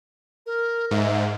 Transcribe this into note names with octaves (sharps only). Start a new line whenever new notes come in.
A#4
G#2 E5